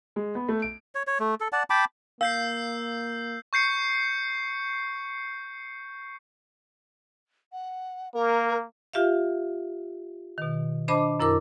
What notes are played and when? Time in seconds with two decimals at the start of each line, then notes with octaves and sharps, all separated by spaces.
0.16 G#3
0.35 B3
0.49 A3
0.62 D7
0.95 C#5
1.07 C#5
1.20 A3
1.40 A4
1.52 D5 F#5 A5
1.70 G5 A5 B5 D6
2.21 A#3 F5 E6 G6 C7
3.53 C#6 G6 C7 C#7
7.52 F#5
8.14 A#3 A#4
8.94 F4 G4 E5 F5
10.38 B2 D#3
10.88 D4 C5 D#5 A5 B5 D6
11.20 F#2 E4 A#4 D6